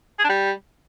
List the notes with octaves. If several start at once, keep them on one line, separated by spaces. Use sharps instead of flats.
G#4
D4
G3